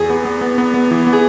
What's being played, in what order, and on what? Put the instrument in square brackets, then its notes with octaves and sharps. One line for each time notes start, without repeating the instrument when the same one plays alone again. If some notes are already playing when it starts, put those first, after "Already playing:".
Already playing: [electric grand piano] E2 [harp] G#4
[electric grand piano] B3
B3
B3
B3
B3
E3
B3
[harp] G#4